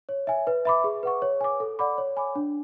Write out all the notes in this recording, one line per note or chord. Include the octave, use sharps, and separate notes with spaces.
C#5
E5 G#5
B4
E5 B5 D6
G#4
B4 F#5 C#6
C#5
G#5 D6
A4
D5 F#5 B5 D6
C#5
G#5 B5 D6
D4